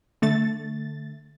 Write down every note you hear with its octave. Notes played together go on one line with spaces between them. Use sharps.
D3 A3 A6